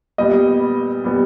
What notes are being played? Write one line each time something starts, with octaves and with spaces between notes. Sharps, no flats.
A#2 G3 B3 D#5
A#2 G3 B3